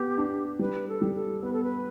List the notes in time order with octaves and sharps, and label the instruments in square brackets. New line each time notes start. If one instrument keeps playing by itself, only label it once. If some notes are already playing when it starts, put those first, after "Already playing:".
Already playing: [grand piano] B3 [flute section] G4
[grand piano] D4
[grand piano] G3 [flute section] B4
[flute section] A4
[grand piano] G3
[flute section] A4
[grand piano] B3 [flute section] B4
[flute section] A4
B4